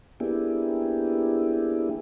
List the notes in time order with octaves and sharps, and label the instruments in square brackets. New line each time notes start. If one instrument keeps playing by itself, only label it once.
[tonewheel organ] A#3 B3 D4 E4 G4 G#4